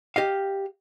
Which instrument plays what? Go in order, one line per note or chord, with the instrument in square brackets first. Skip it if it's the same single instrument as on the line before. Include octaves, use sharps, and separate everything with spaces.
[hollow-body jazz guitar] G4 D#5 F5